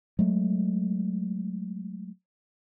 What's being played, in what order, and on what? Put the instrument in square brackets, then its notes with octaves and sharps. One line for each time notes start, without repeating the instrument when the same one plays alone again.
[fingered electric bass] F#3 G#3 A3